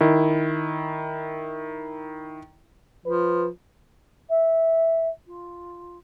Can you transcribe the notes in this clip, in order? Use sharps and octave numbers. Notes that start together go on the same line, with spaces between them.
D#3 E4
F3 B4
E5
F4